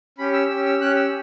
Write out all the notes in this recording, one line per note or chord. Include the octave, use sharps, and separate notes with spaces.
C#4 G4 B5
E6
C#4 G4 E6
E6
C#4 G4 F#6
E6